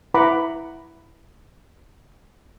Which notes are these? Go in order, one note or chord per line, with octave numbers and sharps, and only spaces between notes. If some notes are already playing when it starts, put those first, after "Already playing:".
E4 B4 F#5 A#5 B5 D6